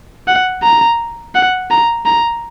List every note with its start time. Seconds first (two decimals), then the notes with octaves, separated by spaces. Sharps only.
0.27 F#5
0.62 A#5
1.35 F#5
1.70 A#5
2.05 A#5